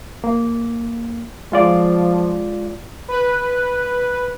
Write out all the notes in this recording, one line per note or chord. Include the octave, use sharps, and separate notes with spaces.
A#3
F3 G#3 F4 D5
B4